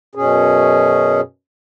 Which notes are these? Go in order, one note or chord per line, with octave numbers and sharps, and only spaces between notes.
F#2 B2 C#4 G#4